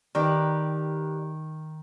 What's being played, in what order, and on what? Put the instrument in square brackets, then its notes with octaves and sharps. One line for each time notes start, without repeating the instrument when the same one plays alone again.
[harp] D#3 [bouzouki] D4 G4 B4